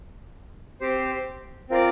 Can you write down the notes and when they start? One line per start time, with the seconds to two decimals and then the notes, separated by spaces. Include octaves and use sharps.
0.80 C4 G4 C5
1.69 C4 F4 A#4 D5